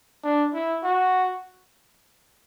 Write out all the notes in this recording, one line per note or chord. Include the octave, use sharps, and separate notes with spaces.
D4
E4
F#4